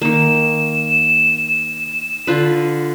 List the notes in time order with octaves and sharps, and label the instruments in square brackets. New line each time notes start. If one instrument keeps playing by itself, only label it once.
[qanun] D#3 A#3 [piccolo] E7
[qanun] D3 F4 B4